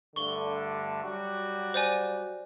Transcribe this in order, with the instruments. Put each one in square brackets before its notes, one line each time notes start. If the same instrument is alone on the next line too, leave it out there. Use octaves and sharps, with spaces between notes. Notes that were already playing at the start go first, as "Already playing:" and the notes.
[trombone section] G2 D3 A3 [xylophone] C#6 G7
[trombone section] F#3 G3 F#4
[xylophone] C5 D5 G#5